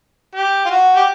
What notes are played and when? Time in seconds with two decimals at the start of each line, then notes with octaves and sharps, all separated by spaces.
0.35 G4
0.65 F4
0.70 F#4
0.96 G4